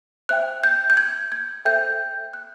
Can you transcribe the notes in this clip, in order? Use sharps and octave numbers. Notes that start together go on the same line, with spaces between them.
C5 E5 G5 F#6
G6
G6
G#6
G#6
A4 C5 E5 G5 G6
F#6